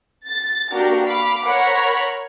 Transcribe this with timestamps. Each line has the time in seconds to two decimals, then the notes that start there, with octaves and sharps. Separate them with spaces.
0.25 A6
0.72 A#3 D4 F#4 G4 A#4
1.03 F5 B5 D6
1.45 A#4 C5 C#5 F#5 B5